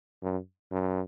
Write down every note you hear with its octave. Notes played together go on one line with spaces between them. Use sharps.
F#2
F#2